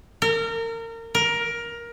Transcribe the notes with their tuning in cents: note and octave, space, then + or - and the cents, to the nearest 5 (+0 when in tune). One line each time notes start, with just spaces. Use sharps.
A#4 -30
A#4 +15